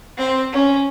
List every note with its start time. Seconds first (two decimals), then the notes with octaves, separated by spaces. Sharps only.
0.17 C4 C5
0.52 C#4